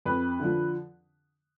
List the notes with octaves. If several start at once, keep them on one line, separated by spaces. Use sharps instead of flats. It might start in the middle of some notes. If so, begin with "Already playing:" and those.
F2 B4
D3 F3